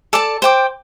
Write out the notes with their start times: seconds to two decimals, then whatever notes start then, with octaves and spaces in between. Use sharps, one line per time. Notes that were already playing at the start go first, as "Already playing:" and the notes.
0.13 A4 D5 A5
0.42 C5 G5 D6